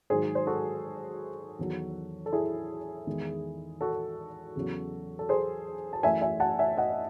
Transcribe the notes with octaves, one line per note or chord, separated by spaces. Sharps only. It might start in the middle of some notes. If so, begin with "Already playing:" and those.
G#2 D#3 F#3 G#4 C5
C5
F#4 A4
E2 D#3 F#3
A4
E4 G#4
E2 D#3 G#3
F#4 A4
E2 C#3 F#3
A4
G#4 C5
A5
F#2 E3 A3 E5 G#5
E5 G#5
F#5 A5
E5 G#5
D#5 F#5